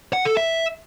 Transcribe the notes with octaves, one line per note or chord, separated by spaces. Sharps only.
F#5
A4
E5